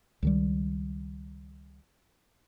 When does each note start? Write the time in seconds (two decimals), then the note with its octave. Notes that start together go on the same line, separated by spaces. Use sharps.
0.22 C#2 D#3 G3